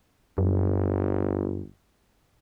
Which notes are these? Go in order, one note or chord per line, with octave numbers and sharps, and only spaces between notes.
G1 F#2